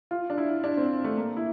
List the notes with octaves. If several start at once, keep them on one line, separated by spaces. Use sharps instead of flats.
F4
D4
E4
D4
C4
A3
A#3
E4